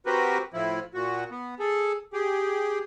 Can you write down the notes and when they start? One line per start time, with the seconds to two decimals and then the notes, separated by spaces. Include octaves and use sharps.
0.06 C4 F#4 G4 A#4 B4
0.54 A2 F3 E4
0.94 A#2 F#4
1.31 B3
1.59 G#4 A4
2.13 G4 G#4